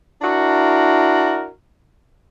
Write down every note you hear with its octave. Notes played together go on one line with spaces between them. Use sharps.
D4 E4 F#4 A#4